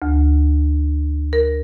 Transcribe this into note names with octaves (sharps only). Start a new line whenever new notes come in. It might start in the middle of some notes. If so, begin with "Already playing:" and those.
D2
A#4